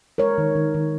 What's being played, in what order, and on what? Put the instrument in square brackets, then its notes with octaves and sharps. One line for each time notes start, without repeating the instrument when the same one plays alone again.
[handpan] G#3 A#4 C#5
D#3
D#3
D#3